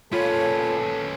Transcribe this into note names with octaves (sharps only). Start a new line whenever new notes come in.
A#2 C#4 F4 A4 B4 C#5